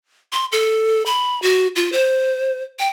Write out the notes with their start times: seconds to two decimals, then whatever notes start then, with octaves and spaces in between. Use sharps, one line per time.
0.33 C6
0.52 A4
1.06 B5
1.42 F#4
1.76 F4
1.92 C5
2.79 G5